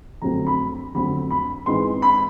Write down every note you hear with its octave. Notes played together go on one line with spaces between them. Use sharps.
F2 D3 F#3 A3 C4 A#5
B5
F2 D3 F#3 A3 C4 B5
B5
G#2 E3 G#3 C4 C6
B5